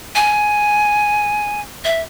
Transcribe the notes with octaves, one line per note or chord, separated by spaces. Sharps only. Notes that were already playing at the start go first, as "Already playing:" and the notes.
G#5
E5